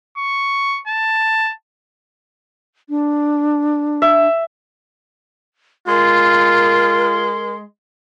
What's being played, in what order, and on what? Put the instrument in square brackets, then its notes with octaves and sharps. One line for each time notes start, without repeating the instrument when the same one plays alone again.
[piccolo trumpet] C#6
A5
[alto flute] D4
[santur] E5
[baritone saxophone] G#3 [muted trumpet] F4 [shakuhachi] A#4